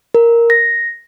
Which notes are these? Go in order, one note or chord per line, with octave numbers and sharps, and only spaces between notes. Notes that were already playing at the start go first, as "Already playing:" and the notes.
A#4
A#6